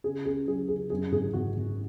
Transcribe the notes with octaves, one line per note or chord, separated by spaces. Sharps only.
C#3 G#4
C#2 G#4
F#3 G#4
C#2 G#4
F#2 G#4
G#1 G#4
G#1 F#4
G#1